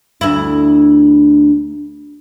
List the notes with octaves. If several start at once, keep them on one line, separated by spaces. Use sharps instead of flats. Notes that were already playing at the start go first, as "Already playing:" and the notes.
D2 E4